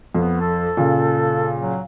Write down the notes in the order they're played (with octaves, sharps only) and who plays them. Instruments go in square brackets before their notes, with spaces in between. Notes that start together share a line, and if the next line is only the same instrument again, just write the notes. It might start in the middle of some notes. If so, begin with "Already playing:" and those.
[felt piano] F2 [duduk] B3
[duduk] A4
[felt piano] A#2 C#3
[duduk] F#3